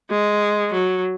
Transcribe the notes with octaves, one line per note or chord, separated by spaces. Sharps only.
G#3
F#3